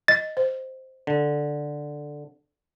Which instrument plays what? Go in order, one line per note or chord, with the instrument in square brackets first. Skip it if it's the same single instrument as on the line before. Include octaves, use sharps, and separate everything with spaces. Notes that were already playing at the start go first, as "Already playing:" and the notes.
[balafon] D#5 [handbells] A6
[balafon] C5
[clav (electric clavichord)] D3